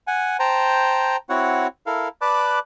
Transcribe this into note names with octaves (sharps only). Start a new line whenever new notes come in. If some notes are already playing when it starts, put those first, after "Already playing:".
F#5 G#5
C5 G5 A5 A#5
C4 E4 F#4 C#5 F#5
E4 A4 A#4 F5
B4 D5 A5 B5 D6 F#6